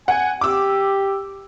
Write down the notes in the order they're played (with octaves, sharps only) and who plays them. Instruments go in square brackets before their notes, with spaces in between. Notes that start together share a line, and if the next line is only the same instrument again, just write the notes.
[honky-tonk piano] F#5 [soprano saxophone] G#5
[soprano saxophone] G4 [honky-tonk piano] D6 E6